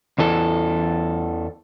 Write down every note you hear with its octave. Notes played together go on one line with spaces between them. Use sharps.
E2 E3 A4